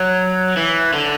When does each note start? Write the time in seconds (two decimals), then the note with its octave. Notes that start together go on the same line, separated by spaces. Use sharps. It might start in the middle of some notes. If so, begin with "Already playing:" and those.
Already playing: F#3
0.57 E3
0.93 D3